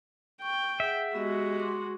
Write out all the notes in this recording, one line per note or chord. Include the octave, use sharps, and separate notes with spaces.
G5 C#6
G#4 E5 F#5
G#3 B3 F#4 G4 D#5
C6 D6